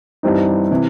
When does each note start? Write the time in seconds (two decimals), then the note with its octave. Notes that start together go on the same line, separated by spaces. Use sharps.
0.23 G2 E3 G3 C4 D#4
0.71 C3 E3